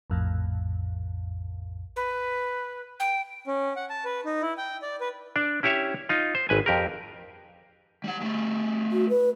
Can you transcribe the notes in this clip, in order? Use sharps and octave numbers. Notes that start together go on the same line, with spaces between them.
A#1 F2 A2
B4
G5
C#4
F#5
A5
B4
D#4
E4
G5
D5
B4
D4 D5
C#4 E4 G4 C#5 E5
D#4 F4
C5
G#1 B4 G#5
F2 G4 A#4
G3 F#5
G3 A3
F#4
B4